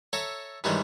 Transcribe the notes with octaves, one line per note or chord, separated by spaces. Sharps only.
A4 C#5 E5 A#5
G2 D#3 E3 G3 G#3 C#4